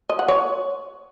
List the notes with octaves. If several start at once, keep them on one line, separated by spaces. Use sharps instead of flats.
D#5
F#5
C#5